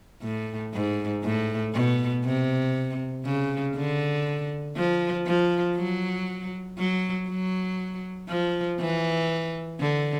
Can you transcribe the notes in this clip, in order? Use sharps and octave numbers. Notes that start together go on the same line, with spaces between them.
A2
G#2
A2
B2
C3
C#3
D3
F3
F3
F#3
F#3
F#3
F3
E3
D3